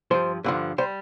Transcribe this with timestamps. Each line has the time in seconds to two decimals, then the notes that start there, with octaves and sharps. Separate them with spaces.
0.11 G2 F3 C5
0.44 G2 D3 F3
0.78 G3 C5